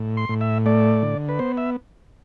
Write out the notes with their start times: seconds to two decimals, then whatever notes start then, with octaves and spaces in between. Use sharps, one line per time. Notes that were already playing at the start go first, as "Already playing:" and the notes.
Already playing: A2
0.17 C6
0.29 A2
0.41 E5
0.66 A3 D5
1.03 D3
1.29 B4
1.39 B3 C5
1.57 E5